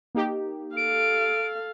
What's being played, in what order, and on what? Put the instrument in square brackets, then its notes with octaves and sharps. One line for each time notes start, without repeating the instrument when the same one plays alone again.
[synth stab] A#3 D#4 G4
[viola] A4 F5 [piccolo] D7